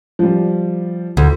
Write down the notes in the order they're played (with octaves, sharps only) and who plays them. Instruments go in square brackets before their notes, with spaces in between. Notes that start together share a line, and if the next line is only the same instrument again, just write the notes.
[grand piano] F3 G3
[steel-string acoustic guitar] D2